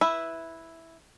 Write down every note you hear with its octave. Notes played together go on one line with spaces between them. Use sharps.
E4 B4 E5